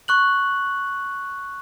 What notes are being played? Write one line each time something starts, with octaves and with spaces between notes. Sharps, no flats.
C#6 F#6 F#7